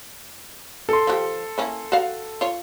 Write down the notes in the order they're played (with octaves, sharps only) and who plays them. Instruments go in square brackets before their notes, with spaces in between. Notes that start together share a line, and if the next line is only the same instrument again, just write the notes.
[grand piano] A4 C6
[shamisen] F3 F#4 G4
A#3 C#4 E4
F#4 F5
F4 C#5